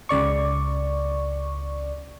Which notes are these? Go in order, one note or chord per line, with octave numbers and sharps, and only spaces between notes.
C#2 C#3 D5 C#6